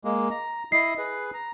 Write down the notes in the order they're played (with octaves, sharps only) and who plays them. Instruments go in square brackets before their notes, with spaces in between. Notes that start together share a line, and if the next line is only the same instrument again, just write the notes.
[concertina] G#3 A#3
A#5
[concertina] E4 D#5 [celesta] C7
[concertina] G#4 B4
A#5